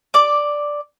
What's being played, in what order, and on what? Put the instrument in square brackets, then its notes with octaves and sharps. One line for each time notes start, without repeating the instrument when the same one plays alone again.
[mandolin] D5 D6